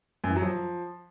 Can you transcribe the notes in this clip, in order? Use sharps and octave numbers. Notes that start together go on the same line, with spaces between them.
F#2
E3
F#3
F3